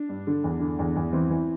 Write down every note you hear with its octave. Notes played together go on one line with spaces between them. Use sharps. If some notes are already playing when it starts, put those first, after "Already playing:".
Already playing: D4
G2
D3
E2
D3
E2
E2
E3 C4
E3